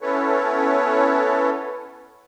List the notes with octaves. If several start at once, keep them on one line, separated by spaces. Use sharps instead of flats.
B3 C#4 E4 A4 B4 C#5